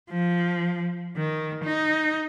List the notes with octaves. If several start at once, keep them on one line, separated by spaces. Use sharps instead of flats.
F3
D#3
D#4